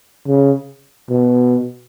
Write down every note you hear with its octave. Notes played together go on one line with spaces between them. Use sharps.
C#3
B2